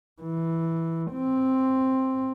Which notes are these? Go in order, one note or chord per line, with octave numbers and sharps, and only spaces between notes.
E3
C4